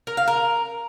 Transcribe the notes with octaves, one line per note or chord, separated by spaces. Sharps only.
A#4
F5
A#4